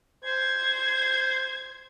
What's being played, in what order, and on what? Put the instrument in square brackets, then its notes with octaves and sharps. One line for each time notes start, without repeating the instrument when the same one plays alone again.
[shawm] C5 [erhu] G#6